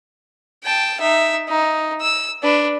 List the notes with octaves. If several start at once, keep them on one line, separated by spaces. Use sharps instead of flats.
G5 A5
D#4 E5
D#4
E6
D4 B4